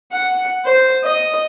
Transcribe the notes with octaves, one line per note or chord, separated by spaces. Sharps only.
F#5
C5
D#5